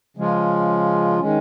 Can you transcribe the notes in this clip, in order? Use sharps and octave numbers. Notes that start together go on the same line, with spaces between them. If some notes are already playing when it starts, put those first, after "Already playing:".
C#3 F3 G#3 C#4 F4
D#3 G#3 C#4